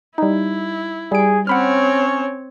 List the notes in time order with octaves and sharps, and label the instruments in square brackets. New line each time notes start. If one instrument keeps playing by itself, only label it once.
[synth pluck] G3 D#4 [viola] E4
[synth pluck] G3 D7 [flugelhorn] G#4
[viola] C4 C#5 [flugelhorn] C#4 [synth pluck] F#5 B5 F6